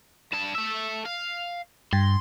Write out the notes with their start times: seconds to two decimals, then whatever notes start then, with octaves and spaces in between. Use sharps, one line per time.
0.33 G2 A5
0.55 A3 E5
1.05 F5
1.93 G2 C6